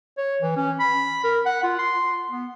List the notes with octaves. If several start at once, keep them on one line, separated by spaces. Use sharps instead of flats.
C#5
E3
C#4
B5
A#4
F#5
F4
C6
B3